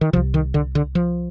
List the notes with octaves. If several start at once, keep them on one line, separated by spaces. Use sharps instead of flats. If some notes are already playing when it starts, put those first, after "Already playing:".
D#3
C2 C3 F3
D#3
D3
D3
F3